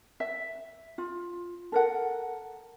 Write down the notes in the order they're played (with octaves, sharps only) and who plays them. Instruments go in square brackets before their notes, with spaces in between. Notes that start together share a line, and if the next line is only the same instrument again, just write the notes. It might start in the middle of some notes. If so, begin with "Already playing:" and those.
[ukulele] E5
F4
A4 A#4 F#5